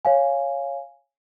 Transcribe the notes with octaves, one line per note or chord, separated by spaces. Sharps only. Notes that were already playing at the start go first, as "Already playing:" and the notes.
C#5 F5 G#5